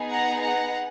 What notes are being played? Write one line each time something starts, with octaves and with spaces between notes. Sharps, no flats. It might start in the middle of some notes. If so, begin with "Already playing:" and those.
Already playing: B3 D#4 G#4
F#5 A#5
F#5 A#5